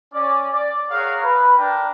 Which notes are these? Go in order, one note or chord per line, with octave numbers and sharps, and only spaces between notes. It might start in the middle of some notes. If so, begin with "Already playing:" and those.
C#4 D5
D5
G#4 A#4 C#5 F5 F#5 A#5
B4
D4 A#4 G5 A#5